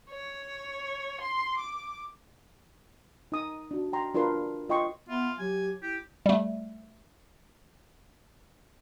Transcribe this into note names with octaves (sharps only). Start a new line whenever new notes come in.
C#5
C6
D6
D#4 D#6
D4 F#4
G5 A#5 C6
D4 F4 A#4 B4 C6
F4 D#5 G5 C6 C#6
B3 F4 E5
F#3 G4 G#5
E4 G4
G3 A3